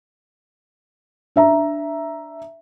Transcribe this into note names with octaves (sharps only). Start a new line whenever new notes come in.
D4 E5 A#5